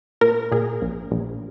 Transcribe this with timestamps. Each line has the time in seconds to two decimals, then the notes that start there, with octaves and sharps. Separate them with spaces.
0.21 A#2 A#4
0.52 A#2 G#4
0.82 A#1
1.11 A#1